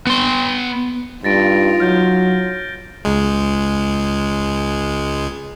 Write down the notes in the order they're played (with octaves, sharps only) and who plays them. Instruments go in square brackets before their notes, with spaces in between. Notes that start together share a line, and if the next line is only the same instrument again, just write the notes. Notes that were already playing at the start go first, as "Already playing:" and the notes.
[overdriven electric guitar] B3 C6
[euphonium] G2 [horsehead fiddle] D#4 F4 [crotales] A6 A#6 D7
[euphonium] F#3 [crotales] F6 G6
[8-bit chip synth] C#2 G#3